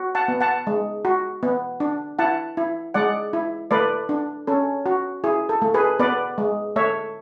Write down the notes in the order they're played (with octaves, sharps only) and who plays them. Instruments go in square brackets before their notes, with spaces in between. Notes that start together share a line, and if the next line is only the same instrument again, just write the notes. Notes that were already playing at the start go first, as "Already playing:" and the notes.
Already playing: [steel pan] F#4
F#5 A5
B3
F#5 A5
G#3
F#4
B3
D4
E4 F#5 A5
E4
G#3 D5 F#5
E4
A3 B4 D5
D4
C#4 A4
F#4
E4 G#4
A4
A3
G#4 B4
B3 B4 D5
G#3
A3 C#5 E5